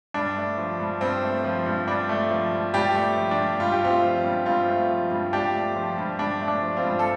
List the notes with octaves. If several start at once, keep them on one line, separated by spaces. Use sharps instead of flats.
G2 D4
A3
F3
G2
G2 C4
A3
F3
G2
G2 D4
A3
F3
G2
G2 D4 G4
A3
F3
D4
G2
G2 F4
G4
A3 C4 F4
F3
G2
G2 C4 F4
A3
F3
G2
G2 D4 G4
A3
F3
G2
G2 D4
A3
D4
F3
C4 F4
G2
A4